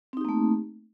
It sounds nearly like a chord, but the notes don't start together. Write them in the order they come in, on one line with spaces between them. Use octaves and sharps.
C4 D#4 G4 A#3 A3